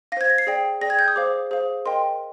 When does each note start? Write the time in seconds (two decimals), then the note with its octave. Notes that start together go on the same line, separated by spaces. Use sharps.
0.12 F5 A#6
0.17 C5 G#6
0.30 A#6
0.38 C7
0.47 G#4 D5 G5
0.81 G#4 D5 G5 A#6
0.90 G#6
0.99 G6
1.08 D#6
1.16 G#4 C5 F5 D6
1.51 G#4 C5 F5
1.86 A#4 D#5 G5 C6